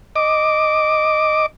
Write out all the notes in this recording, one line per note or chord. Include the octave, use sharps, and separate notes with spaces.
D#5 D6